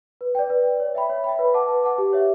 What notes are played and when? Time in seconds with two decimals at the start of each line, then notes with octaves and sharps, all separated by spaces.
0.21 B4
0.35 D5 G5
0.50 B4
0.65 D5 G5
0.80 C#5
0.95 E5 G5 B5
1.10 C#5
1.24 E5 G5 B5
1.39 B4
1.54 F#5 A5 D6
1.69 B4
1.84 F#5 A5 D6
1.98 G4
2.13 C#5 E5